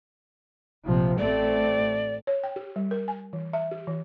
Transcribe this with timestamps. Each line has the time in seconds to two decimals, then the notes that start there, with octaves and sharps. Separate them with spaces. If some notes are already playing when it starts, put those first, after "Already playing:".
0.85 A#1 C3 F3
1.18 A1 A3 C4 D5
2.27 C#5
2.43 G5
2.56 G4
2.76 G3
2.91 A#4
3.08 G#5
3.33 E3
3.53 E5
3.71 G4
3.87 E3